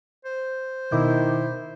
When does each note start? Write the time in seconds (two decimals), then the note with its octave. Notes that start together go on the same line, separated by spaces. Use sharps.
0.25 C5
0.92 B2 D#3 E4 D6 G6